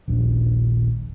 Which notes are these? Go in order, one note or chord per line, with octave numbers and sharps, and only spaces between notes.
D#1 A#1 D4